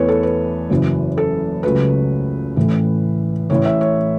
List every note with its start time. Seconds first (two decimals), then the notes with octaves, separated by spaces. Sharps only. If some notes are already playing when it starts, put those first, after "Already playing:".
Already playing: E2 E3 A3 B4 C#5
0.09 A4
0.23 B4
0.70 F#1 F#2 E3
1.18 A4
1.63 C#2 C#3 F#3 A3 B4
2.56 A1 A2 E3
3.50 A1 A2 E3 A3 C#5
3.65 E5
3.81 C#5